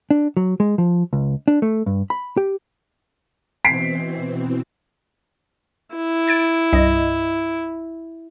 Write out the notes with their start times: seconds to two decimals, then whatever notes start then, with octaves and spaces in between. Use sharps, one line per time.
0.11 D4
0.37 F#3
0.60 G#3
0.78 F3
1.13 C#2
1.48 D4
1.62 A3
1.86 G2
2.10 B5
2.37 G4
3.65 B2 E3 C4 B6 C7 D7
5.96 E4
6.27 G#6 A6 D7
6.73 C2 G2 D#5